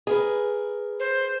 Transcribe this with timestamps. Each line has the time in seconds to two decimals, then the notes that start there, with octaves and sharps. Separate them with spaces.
0.07 G#4 A#4 B4
1.00 C5